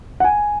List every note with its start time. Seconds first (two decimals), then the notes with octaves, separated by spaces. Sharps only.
0.20 F#5
0.24 G#5